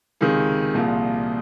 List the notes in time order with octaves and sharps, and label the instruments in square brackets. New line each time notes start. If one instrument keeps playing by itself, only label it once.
[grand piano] C#2 C3 D#3 G#4
C2 A#2 F3